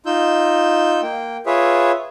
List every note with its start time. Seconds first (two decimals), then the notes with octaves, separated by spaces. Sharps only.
0.06 D#4 F4 E6 G6
1.02 A#3 G5
1.46 F4 G#4 B4 C#5 E5